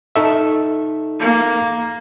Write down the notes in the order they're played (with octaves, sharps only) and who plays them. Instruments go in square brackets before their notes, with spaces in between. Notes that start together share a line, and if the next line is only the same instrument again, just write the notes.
[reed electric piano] D#4 A4 E5
[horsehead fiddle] A#3